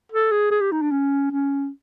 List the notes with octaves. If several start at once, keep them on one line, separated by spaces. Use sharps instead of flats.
A4
G#4
G#4
G4
D#4
D4
C#4
C#4